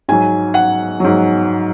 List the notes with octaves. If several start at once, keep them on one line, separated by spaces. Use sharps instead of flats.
G#2 F#3 G#5
F#5
G#2 F#3